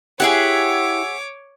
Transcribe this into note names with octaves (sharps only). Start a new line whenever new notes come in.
E4 G4 G#4 C#5 E5 F#5 D6